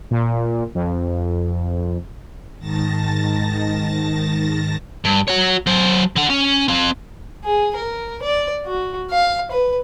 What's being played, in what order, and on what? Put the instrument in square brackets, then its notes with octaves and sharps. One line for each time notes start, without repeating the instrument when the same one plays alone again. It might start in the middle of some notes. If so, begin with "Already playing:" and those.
[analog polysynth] A#2
F2
[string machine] G#2 D#3 A5 A6 A#6
[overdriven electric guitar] G2
F#4 C#5
F#3 C5
D3 F#5
C#4
C4 F5
[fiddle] G#4
A#4
D5
F#4
F5
B4